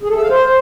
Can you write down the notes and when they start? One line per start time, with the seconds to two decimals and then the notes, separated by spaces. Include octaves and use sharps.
0.02 G#4
0.09 A4
0.16 E5
0.23 F5
0.30 C5